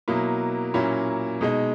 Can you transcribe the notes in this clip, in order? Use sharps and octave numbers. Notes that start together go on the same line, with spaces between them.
B2 F#3 A#3 E4
A#2 F#3 A#3 C#4 E4
B2 G#3 D#4